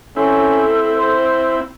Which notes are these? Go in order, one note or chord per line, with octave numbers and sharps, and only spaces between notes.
C4 C#4 E4 A4
C5